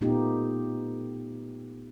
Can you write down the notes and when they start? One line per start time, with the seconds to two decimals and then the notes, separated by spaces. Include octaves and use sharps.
0.01 A#2 A3 B3 D#4 F4 G4